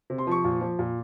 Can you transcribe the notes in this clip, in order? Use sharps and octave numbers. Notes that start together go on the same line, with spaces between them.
C3
C6
F3 C#6
A#2
F3
A#2